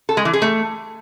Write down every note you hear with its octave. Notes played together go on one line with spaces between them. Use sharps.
A4
G#3
E3
G#4
A3